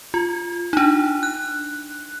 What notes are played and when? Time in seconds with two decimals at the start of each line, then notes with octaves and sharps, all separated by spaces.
0.14 F4
0.73 D4 D#4
1.23 F#6